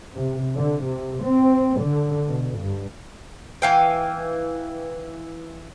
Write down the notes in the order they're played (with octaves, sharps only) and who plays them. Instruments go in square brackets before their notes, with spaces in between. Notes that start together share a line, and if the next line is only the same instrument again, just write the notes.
[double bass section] C3
D3
C3
C4
D3
B2
G2
[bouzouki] E3 F5 G5